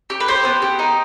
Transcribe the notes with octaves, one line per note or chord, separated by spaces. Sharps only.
G4
B4
G4 C5
B3
G4
D#4